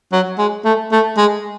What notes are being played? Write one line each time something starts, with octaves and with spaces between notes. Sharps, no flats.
F#3
G#3
A3
A3
G#3